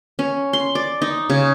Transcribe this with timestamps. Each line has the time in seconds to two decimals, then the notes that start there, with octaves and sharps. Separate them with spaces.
0.19 C#4
0.53 C6
0.75 D5
1.02 D#4
1.30 C#3